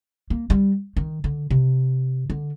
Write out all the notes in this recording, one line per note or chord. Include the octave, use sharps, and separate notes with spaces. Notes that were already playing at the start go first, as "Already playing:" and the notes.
A#3
G3
D#3
D3
C3
D3